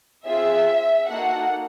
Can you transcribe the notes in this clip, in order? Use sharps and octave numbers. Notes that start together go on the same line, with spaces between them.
C4 F4 G#4 E5
A#3 D#4 F#4 A4 F#5